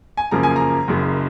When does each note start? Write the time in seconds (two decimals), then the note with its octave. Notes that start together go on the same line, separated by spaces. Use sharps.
0.17 G#5
0.31 F#2 C#3 F3 A#3 A#5
0.43 G#5
0.56 A#5
0.88 F#1 F#2 C#3